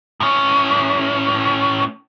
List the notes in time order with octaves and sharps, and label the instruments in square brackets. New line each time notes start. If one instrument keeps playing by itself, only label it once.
[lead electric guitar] A2 C#4